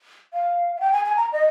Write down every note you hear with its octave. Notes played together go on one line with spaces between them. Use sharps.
F5
F5
G5
G#5
G#5
A#5
D#5